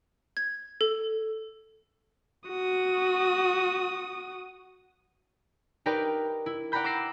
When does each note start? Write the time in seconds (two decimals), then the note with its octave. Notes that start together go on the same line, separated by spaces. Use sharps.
0.37 G#6
0.81 A4
2.49 F#4 D#6
5.86 D#4 G4 A#4 B4 D5 G5
6.46 E4
6.72 D5 F#5 G5 A#5 B5 G6
6.84 D6 E6 A#6 C7